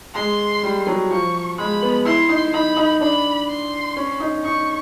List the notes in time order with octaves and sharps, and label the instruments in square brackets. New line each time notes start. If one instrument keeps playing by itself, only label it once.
[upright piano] G#3 [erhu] C6
[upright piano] G3
F#3
[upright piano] F3 [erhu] C#6
[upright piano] G#3 [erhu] B5
[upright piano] B3
[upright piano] E4 [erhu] C6
[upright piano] D#4
[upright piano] D#4 [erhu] B5
[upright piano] D#4
[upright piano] D4 [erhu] B5
[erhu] C6
[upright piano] C#4
D#4
[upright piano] D#4 [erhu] C#6